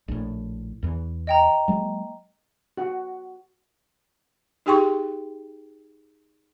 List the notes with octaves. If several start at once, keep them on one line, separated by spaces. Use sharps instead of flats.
A#1 A2
E2 E3
D#5 G5 A#5
F#3 G#3 A#3
F#4 F#5
D#4 G4 G#4 G5 C6 C#6